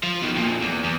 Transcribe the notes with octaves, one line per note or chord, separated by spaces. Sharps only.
F3
B2 D#3
F2 A#2
E2
E2